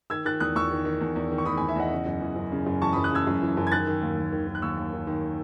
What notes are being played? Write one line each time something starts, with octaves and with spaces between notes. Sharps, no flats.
D#3 E6 G#6
D#3 F#6 A6
E2 D#6 F#6
E2 C#6 E6
D#3
D#3
E2
E2
D#3
C#6
D#3 B5 D#6
E2 G#5 B5
E5 G#5
E2 D#5 F#5
C#3
F#2
E3
F#2
C#3
F#2
E3 A5 C#6
F#2 B5 D#6
D#6 F#6
C#3 E6 G#6
F#2
E3
F#2
G#6
D#3 F#6 A6
D#3
D#2
D#2
D#3
D#3
F#6
D#2 C#6 E6
D#2
D#3
D#3